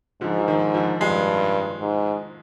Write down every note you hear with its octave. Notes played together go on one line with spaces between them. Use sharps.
G#2 D3 F3
F3
D#3
D3 F3
G2 F3 G#3
G#2